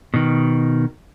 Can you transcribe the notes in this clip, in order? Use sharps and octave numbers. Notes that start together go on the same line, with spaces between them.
B2 D#3